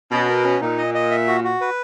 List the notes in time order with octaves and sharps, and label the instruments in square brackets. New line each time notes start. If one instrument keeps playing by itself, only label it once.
[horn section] B2 [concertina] C#4
[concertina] A#4
C#4
[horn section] A#2 [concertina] D#4
[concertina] D#5
D#5
E5
F#4
F#4
B4